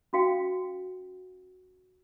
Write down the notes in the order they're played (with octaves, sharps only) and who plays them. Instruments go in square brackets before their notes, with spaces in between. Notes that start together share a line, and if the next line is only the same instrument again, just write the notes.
[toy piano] C#4 F#4 F5 G5